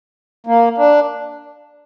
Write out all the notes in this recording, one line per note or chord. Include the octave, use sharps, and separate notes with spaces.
A#3
D4